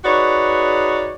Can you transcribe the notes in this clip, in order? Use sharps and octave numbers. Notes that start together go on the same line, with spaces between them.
D#4 F#4 G#4 B4 C#5 D5